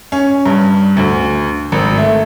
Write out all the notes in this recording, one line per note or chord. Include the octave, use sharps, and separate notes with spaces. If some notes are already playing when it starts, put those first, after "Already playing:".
C#4
G2
D2
G#1
A3